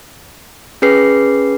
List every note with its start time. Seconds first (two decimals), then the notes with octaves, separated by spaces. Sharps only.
0.82 C#4 G#4 B4 C7